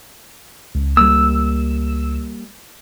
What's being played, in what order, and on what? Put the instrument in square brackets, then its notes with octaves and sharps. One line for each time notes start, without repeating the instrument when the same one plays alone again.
[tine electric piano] C#2
[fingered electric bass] G3 A#3 [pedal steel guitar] E6